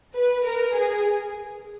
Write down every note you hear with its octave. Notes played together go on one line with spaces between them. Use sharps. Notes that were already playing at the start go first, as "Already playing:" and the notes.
B4
A#4 B4
G#4
G#4